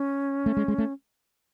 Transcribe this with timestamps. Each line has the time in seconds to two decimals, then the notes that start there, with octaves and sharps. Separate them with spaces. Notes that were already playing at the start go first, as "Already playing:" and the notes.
Already playing: C#4
0.46 A3
0.57 G#3
0.68 G#3
0.78 A3